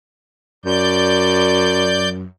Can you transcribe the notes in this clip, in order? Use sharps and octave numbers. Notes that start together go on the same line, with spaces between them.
F#2 D5 G6